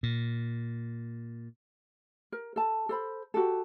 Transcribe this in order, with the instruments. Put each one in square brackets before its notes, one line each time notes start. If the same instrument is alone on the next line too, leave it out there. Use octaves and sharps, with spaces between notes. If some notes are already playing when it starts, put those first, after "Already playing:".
[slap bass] A#2
[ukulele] A#4
A4 A5
A4 C5 B5
F#4 G4 A4